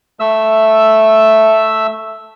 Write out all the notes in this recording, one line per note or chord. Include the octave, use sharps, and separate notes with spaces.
A3 E5 E6